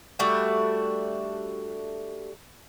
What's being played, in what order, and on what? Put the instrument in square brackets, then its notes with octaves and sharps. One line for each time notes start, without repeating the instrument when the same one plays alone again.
[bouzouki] G3 A3 D4 F#4